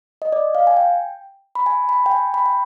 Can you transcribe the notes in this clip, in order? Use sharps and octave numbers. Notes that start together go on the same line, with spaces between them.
D#5
D5
F5
G#5
G5
B5
G#5
B5
G5
G#5
B5
G5